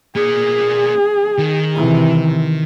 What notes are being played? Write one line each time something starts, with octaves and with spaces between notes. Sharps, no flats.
A#3 G#4 D5
D#3
C3 E3